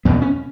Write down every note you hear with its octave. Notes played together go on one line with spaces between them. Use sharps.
E2 B2 B3
C#4